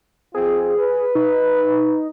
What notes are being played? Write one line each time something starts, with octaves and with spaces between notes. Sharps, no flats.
F2 C4 F4 G#4
B4
D#4